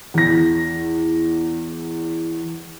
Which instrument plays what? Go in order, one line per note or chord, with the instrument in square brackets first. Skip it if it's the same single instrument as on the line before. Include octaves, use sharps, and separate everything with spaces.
[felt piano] E2 A#6